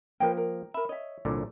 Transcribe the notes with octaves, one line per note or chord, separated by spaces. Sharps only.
F3 A#3 A#4 B4 G5
A#4
A#4 E5 B5
C#5 D#5 E5
C2 A#2 D3